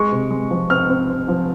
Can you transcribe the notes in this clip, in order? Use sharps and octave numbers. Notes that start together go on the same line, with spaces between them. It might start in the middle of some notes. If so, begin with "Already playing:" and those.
Already playing: G#3 C#6
C3
G#3
F3
C4 F6
C4
C4
F3